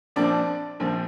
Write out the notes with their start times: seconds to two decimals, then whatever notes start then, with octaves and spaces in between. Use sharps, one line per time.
0.16 A#1 A#2 F3 C4 D4 D5
0.80 A#1 A#2 F3 C4